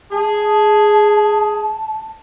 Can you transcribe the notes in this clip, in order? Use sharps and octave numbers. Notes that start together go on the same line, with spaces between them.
G#4 A5